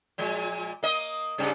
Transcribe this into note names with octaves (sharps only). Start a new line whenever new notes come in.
A#2 F3 G#3
A#3 D#5
G2 C#3 G3